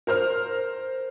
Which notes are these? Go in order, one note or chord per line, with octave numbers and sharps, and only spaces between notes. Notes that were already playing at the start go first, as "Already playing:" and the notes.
A#4 C5 F6